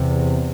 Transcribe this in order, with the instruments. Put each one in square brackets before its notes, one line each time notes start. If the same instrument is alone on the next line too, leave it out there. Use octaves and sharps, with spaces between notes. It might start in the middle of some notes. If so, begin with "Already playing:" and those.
Already playing: [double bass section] E2 C3